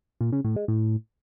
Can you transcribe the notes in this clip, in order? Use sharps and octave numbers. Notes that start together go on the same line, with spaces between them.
A#2
C#3
A2
G#3
A2